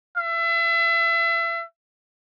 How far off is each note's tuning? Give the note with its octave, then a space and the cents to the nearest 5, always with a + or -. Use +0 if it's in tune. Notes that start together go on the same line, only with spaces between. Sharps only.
E5 +30